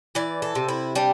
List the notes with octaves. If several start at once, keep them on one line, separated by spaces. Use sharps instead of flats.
E3 D5
A4
C3
E4
G3 D4